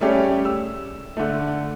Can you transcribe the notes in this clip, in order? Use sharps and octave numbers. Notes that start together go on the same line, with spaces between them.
G3 A3 C#4 G4 G#4
E6
D3 A3